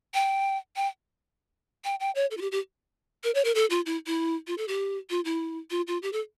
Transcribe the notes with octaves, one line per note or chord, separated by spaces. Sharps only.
G5
G5
G5
G5
C#5
A4
F4
G4
G4
A#4
C#5
A#4
A4
F4
E4
E4
F4
A4
G4
F4
E4
F4
F4
G4
A4